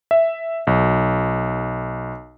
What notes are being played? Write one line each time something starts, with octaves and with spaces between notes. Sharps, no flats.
E5
B1